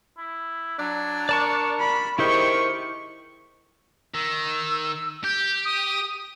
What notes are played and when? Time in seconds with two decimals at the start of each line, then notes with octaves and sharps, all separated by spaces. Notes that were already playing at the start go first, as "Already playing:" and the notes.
0.17 E4
0.79 F#3 D4
1.29 A#4 D5 A5 C#6
1.80 B5
2.19 D#3 E4 G4 G#4 C5 C#6
4.15 D#3 E6
5.24 G4 G6
5.65 D#6